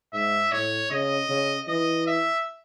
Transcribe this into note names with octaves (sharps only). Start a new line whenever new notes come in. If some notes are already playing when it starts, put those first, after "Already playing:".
G#2 E5
A2 C#5
C#3 D#5
C#3
E3 D#5
E5